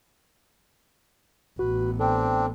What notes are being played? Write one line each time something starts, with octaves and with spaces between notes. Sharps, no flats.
A1 B3 F#4 B4
C4 D4 A4 G5